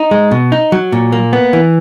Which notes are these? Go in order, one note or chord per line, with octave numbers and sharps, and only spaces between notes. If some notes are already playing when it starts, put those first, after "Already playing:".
Already playing: D#4
G#3
B2
D#4
F#3
A#2
A#3
B3
E3